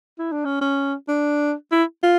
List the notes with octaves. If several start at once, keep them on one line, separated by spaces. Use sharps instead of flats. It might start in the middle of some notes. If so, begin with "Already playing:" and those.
E4
D4
C#4
C#4
D4
E4
F4